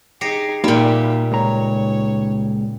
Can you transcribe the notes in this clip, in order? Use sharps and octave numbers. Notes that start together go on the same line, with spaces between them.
D#4 G4 G#4 A#6 C7 C#7
A#2 G3 A#3 D#4 G4 E5 G5
C#2 C#5 A#5